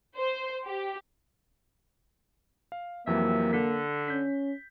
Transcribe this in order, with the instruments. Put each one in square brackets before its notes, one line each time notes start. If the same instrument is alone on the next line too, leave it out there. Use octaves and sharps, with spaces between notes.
[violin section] C5
G4
[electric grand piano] F5
[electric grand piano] F2 E3 F#3 [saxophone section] C3 E5 [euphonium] A#3
[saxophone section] D3 [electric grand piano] B6
[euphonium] C#4 [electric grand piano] G6 B6